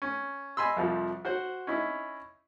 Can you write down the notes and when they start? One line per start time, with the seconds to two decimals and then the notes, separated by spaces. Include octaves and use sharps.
0.02 C#4
0.57 D#5 G#5 B5 C6 E6
0.77 C2 F2 F3
1.25 F#4 C5 F#5
1.67 C#4 D#4 E4